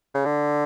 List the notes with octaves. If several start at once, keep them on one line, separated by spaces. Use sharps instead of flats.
C#3
D3